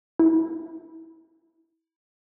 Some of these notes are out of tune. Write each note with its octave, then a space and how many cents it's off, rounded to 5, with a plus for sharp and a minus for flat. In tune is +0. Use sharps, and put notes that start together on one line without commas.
E4 -20